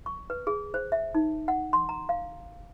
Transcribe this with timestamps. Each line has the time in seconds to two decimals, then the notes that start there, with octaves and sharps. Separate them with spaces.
0.06 C#6
0.30 B4
0.47 G#4
0.74 C5
0.92 E5
1.15 D#4
1.48 F#5
1.73 C6
1.89 A#5
2.09 F5